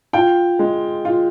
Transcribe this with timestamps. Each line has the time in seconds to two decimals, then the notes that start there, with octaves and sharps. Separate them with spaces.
0.13 F4 G5
0.59 G#3
1.05 F4